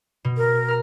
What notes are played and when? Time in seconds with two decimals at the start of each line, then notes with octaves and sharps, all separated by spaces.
0.25 B2
0.37 A#4
0.68 A#5 F6